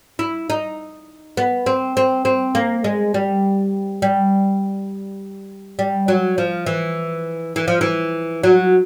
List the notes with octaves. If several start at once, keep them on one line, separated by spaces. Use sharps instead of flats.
E4
D#4
B3
C4
C4
C4
A#3
G#3
G3
G3
G3
F#3
F3
E3
E3
F3
E3
F#3